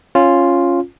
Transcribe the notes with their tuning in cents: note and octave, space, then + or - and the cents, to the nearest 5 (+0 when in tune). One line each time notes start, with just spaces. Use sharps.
C#4 -10 F4 +0